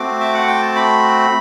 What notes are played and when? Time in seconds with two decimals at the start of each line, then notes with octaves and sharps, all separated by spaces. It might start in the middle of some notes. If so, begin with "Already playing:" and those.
Already playing: A3 C4 F#4 D6
0.21 E5
0.34 F#5
0.47 G5
0.62 A5
0.76 B5